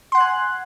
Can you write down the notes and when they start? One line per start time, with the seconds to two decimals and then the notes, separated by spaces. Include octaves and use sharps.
0.12 C6
0.15 F#5
0.18 F#6
0.20 G#5